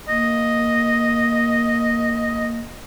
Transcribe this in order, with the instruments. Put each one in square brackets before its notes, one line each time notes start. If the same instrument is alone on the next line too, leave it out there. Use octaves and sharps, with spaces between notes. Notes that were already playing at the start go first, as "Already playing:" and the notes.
[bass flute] A#3 [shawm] D#5